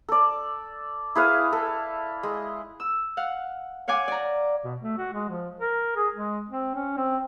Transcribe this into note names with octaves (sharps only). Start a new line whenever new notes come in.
A4 D5
E4 G#4 B4 F5
A4
G#3
E6
F5 F#5
C#5 F5 F#5 G#5 D6
D5 A#5
B2
A3
F#4
G#3
F3
A#4
G#4
G#3
C4
C#4
C4